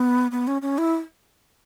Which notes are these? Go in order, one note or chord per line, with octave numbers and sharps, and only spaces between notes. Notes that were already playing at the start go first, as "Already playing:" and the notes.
Already playing: B3
B3
C#4
C#4
E4